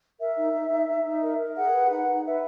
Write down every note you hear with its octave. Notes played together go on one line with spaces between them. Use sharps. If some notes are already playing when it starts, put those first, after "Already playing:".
A#4 E5
D#4
D#4
D#4
D#4
D#4
A#4
A#4
G#4 F#5
B4
D#4 F#5
D#4
B4 E5